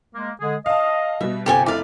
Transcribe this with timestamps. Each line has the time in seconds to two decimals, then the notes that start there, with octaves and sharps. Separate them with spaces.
0.15 G#3 A#3
0.40 D3 G#3 G#4
0.66 D#5 F5 A5
1.21 B2 G3 E5
1.46 G1 C3 C4 G4 A4 G#5
1.66 F1 E4 D5 F5 D6